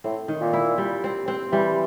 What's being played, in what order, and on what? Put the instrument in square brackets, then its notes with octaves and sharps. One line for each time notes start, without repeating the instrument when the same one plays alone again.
[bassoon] A2 [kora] C4
[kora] D#3
[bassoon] A#2
[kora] E4
G3
C4
C4
[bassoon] E3 [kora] G3